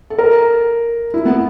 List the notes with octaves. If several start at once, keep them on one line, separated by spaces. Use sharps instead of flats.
A4
A#4
E4
B3